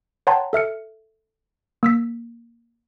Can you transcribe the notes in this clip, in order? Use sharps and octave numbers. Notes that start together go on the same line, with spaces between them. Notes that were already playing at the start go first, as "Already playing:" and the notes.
C#5 F#5 G5 A5 A#5 C6
A4 E5 F6 C#7
A#3 E6 B6